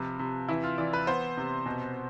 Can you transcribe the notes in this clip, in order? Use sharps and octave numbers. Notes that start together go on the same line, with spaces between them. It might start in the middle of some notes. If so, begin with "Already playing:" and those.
Already playing: C3 F3 B4
C3
E3 E4
F4
E3 D5
B4
B3 C5
C3
B2